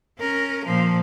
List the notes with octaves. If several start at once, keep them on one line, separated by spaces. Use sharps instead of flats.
C#4 A#4
A#2 F3